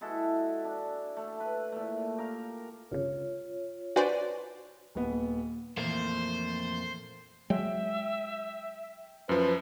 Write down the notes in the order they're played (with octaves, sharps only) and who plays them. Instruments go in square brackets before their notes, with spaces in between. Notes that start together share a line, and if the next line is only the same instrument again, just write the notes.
[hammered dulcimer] G#3 E4 F#4 A4
D4
A3
B4
A#2 A3
G4 A#4 F5
[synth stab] G1 C#2 [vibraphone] F4 C#5
[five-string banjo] D4 B4 G#5 [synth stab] F#4 C5 D5
[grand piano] D#1 B3
[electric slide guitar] F2 A3 A#3 [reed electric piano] A#2 E3 [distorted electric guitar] C5
[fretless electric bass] F#3 G#3 [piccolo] E5 [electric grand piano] G5
[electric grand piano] F#2 F3 [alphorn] B4